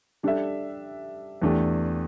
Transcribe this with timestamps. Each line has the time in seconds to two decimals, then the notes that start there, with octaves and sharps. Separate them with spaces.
0.23 G3 D4 A4 E5
1.42 E2 E3 A3 D4 G4